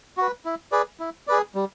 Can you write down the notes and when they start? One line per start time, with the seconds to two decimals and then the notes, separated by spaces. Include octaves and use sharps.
0.17 F#4 B4
0.45 E4
0.72 G#4 B4 D5
1.00 E4
1.27 G#4 B4 D5
1.55 G3